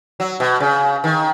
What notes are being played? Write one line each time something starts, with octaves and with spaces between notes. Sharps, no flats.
F#3
B2
C#3
D#3